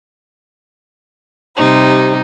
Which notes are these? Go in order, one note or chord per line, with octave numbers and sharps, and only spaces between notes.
C3 G3 D#4 C5